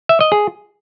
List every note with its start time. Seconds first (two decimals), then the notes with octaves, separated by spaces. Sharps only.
0.09 E5
0.21 D#5
0.32 G#4